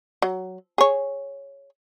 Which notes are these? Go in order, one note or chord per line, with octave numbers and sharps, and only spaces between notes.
F#3
G#4 C#5